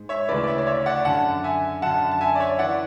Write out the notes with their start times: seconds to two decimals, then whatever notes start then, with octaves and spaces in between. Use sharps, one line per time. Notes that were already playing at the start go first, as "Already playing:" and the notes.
Already playing: G#2
0.09 C#5 E5
0.28 D2 C#3 E3 B4 D5
0.43 D5
0.47 C#5 E5
0.58 D5
0.67 C#5 E5
0.86 D5 F#5
1.05 F#2 D3 F#5 A5
1.44 E5 G#5
1.82 F#2 D3 F#5 A5
2.11 A5
2.21 E5 G#5
2.35 D5
2.40 C#5 E5
2.59 E3 D5 F#5